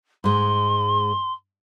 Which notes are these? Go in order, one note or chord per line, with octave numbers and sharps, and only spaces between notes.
G#2 G#3 C6